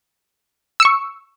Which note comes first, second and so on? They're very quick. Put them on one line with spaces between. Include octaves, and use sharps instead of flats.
E6 C#7 C#6